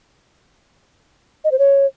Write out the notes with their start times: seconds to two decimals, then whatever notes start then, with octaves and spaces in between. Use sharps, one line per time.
1.44 D#5
1.52 C5
1.59 C#5